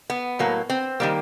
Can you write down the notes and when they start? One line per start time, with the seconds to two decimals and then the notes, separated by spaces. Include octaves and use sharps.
0.10 B3
0.39 A2 F#3 A#3
0.70 C4
1.00 D#3 G3 A#3